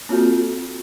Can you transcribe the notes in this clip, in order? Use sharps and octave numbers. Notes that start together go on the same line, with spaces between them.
A#3 C4 F4 F#4 A4